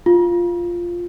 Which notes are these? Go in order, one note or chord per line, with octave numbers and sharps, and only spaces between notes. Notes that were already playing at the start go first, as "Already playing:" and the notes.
F4